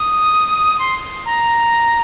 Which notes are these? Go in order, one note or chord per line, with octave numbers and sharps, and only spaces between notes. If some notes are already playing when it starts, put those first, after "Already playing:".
Already playing: D#6
C6
A#5